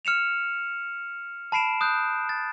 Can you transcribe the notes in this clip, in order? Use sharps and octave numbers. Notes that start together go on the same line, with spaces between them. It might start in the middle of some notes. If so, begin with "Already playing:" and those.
F6 C#7 E7 F7
A5 B5 C7 D7 E7
D#6 F#6 G6
A6